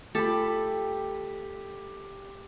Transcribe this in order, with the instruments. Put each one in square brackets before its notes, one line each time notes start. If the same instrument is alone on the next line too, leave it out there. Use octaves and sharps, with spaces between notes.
[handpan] A3 F4 [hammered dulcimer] G4 B5 [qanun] A4